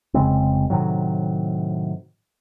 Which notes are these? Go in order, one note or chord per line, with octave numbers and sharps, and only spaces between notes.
F1 C#3 G#3 C4
A2 C3 D#3 F#3